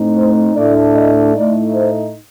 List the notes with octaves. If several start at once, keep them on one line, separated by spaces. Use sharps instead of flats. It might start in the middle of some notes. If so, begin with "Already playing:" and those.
Already playing: A2 A3 C4 D#4
C5
A2 A3 D4 D5
D#5
A2 A3 D#4 D5
C5